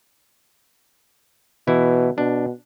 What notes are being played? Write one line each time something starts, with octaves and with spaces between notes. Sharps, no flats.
B2 E3 E4
B2 D4